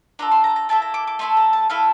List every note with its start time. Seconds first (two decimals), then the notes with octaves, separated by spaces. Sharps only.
0.19 D4 F4 A4 A#5
0.31 C6
0.44 A#5
0.56 A#5
0.69 A#3 E4 A4 A5
0.82 A#5
0.94 D6
1.07 D6
1.19 A3 E4 A4 C6
1.37 A#5
1.53 A5
1.70 A3 E4 A4 F5